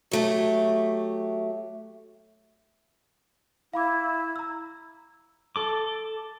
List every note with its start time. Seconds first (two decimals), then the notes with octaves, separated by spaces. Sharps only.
0.11 F#3 A3 G4
3.74 E4 F5 B5 D6
4.36 A#5 E6
5.56 A4 D6